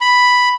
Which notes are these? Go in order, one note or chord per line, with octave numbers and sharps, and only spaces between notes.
B5